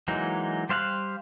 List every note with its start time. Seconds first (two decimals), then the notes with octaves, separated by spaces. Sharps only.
0.08 E3 F#3 G#3 A#3 D#4
0.69 G3 C5 F5 G#5 F#6